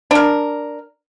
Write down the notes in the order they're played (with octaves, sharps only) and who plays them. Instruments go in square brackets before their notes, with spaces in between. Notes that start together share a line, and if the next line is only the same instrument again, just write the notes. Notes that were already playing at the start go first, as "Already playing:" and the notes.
[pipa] D4 A#4